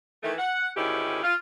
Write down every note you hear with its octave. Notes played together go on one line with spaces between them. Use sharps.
D#3 E3 A3
F#5
D2 G#2 D#3 C#4 E4 G4
F4